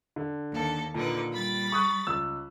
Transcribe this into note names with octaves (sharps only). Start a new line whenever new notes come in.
D3
D#2 A4
A#2 D3 D#4 B4
G3 B5 A6
C#6 D#6 F#6
C#2 E6